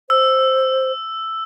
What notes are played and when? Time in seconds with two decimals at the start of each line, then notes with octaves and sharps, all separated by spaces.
0.10 C5 E6